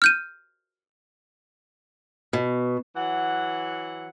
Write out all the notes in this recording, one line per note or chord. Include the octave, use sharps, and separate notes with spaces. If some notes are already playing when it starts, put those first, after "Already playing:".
F6 G6 D#7
B2
E3 F#3 F#5